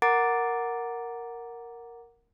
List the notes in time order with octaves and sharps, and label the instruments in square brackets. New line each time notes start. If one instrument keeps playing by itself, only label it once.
[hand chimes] A#4 F#5 A#5 D6 A6 D7